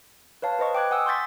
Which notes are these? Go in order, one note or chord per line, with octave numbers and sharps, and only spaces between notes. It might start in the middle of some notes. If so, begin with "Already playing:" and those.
B4 C#5 F5 A5
B4 C5 D#5 C#6
G5 D6 F#6 G#6
F#5 G#5 D#6 E6
C6 C#6 G6 A6 B6